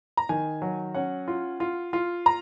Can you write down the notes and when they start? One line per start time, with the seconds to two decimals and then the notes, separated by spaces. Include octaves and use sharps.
0.17 A#5
0.29 D#3 G#5
0.62 F#3
0.95 C#4 F#5
1.28 F4
1.60 F4
1.93 F4
2.26 A#5